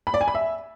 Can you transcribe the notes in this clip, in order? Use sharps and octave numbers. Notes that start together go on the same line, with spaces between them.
B5
D5
G#5
B5
E5